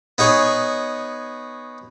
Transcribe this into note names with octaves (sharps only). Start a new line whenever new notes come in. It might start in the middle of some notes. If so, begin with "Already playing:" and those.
B3 D#4 G#4 C#5